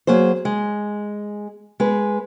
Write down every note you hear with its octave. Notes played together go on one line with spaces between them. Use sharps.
F#3 A#3 G#4 C5
G#3
G#3 B4